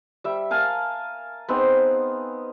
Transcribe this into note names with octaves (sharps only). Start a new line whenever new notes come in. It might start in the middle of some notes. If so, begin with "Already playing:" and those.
G3 E5
A#4 F5 G#5 A5
B3 C4 D#4 G#4